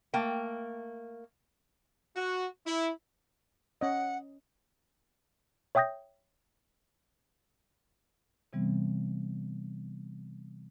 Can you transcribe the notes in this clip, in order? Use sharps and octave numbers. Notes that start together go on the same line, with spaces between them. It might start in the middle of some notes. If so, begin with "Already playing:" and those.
A3 A#3 G5
F#4
E4
C#4 D#5 F#5
C#5 E5 G5 D#6 G6 A#6
C3 E3 G3 B3 C4